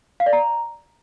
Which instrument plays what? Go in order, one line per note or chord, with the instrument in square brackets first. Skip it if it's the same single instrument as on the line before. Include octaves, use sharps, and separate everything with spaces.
[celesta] F5
D5
A#5